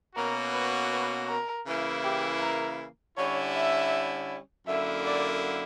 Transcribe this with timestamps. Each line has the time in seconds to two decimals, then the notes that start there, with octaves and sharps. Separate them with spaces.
0.16 B2 A#3 C#4 F#4 A#4
0.53 B4
0.92 B4
1.29 A#4
1.67 C#3 E3 A#3 E4
2.04 G4
2.41 A#4
3.17 D3 G3 C#4 E4 C#5
3.55 E5
4.67 F#2 D3 A#3 E4 E5
5.06 D5